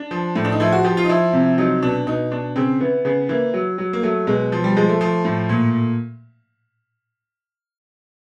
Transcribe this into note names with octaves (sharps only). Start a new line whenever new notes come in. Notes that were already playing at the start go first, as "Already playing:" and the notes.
Already playing: D4
F3
A2
D4
D#4
F3 E4
F#4
F3 G4
F4
D#4
F3 E4
C3
F#3 D#4
B2 D4
B2 D#4
B2 D4
C#3 C4
E3 B3
C#3 B3
E3 A#3
F#3
F#3
A#3
F#3 A3
B2 G#3
F3
G3
F3 G#3
A3
F3
A2
A#2